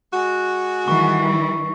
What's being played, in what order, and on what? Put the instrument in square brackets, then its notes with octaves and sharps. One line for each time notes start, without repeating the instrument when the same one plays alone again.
[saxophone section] G#3 F#4
[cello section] D#3 E3 G3 [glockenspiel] C#6